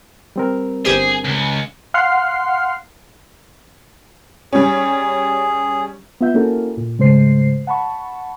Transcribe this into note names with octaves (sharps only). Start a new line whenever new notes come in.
G3 C4 A#4
G1 G4 G#4 C5
C#2
F5 F#5 C6 F6 C7
G3 C#4 G#4
B3 F4 E5 G6
A#3 C#4 E4 F#4 A4 A#4
A#2
G#2 C#3 G#3 A3 C5 C7
F#5 A5 B5 C#6